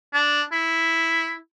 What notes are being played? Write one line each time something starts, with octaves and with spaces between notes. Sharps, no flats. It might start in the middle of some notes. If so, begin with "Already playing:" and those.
D4
E4